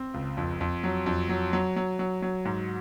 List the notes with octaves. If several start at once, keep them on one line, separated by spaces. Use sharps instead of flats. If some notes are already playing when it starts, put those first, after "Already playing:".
Already playing: C4
C#2
F2
F2
F#3
F2
F#3
F#3
F#3
F#3
F#3
G#2